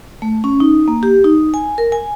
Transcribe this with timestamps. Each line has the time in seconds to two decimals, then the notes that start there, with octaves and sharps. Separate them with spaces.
0.22 A3
0.44 C#4
0.60 D#4
0.88 A#3
1.03 G4
1.24 D#4
1.54 G#5
1.78 A#4
1.92 G#5